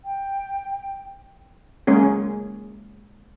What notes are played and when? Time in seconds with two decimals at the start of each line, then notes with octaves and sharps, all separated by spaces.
0.05 G5
1.87 G#3 A#3 C#4 G#4